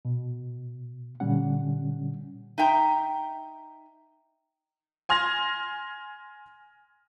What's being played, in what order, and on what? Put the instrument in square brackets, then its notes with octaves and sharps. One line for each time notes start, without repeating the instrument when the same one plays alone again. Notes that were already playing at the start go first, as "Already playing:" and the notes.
[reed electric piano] B2
A#2 D3 G3 C#4 F#5
[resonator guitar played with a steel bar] D#4 E5 G5 A#5
[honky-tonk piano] G#5 C6 F6 G#6 A#6